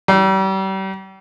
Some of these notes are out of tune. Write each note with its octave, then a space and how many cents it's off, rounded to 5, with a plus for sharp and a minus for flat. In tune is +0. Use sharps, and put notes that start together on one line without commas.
G3 -35